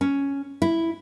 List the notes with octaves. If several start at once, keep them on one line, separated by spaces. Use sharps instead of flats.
C#4
E4